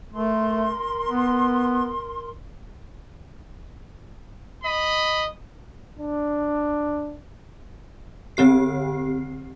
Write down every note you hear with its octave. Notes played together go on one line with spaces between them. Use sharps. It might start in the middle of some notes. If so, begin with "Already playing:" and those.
A3 A#4 C6
B3
D#5 B5
D4
D3 C4 G4 C7